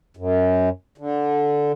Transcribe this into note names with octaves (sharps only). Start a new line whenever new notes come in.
F#2
D3